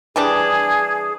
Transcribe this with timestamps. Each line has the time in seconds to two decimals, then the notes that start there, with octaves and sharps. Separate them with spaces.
0.16 E3 G3 D4 G#4